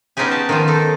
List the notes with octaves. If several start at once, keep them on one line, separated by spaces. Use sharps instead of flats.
B3 C#4 D#4 F4 G4 G#4
A5
D#3 F3 F4
D#4 A4